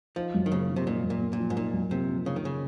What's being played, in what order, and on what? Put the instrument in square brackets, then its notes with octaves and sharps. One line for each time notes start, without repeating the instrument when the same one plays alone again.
[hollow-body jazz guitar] F3 [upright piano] D#4
[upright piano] F#2
[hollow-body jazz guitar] D#3
[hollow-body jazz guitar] C#3 [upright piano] A#3
[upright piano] F3
[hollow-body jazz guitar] C3
[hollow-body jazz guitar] A#2 [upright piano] D#4
[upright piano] F#2
[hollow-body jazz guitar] A#2
[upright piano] A#3
[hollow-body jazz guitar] A#2
[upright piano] F3
[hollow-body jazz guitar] G#2
[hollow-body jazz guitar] A#2 [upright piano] D#4
[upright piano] F#2
[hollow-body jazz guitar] C3 [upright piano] A#3
[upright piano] F3
[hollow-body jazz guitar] C#3 [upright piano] D#4
[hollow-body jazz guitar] D#3
C#3